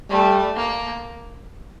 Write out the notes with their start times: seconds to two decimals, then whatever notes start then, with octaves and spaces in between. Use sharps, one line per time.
0.10 G3 A3
0.56 A#3